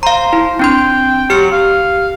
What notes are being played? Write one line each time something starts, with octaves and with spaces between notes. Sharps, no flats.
C5 F5 A#5
E4
C4 D4 G5 C6
F#3 G4 F6 C#7
F5